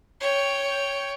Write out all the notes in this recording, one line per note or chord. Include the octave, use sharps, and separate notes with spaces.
C#5 G5